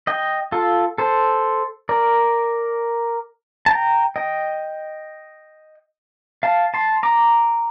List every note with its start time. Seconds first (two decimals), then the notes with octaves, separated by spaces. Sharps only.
0.07 D#5 G5
0.52 F4 A4
0.98 A4 C5
1.89 A#4 D5
3.66 A5
3.71 G5 A#5
4.16 D#5 G5
6.43 F5 A5
6.74 A5 C6
7.03 A#5 D6